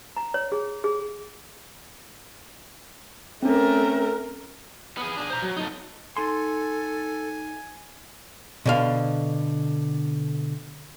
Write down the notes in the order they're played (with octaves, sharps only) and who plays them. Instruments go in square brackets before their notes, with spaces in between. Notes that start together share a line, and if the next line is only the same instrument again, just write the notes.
[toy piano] A#5
C#5
G#4
G#4
[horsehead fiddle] A3 A#4 [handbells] C4 C#4
[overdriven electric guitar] B3 G#4
D4 G#4
C5 A#5
F#3
A3 D#4
[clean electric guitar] D#4 C6 [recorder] A4 [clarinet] G#5
[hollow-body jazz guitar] B2 D3 F5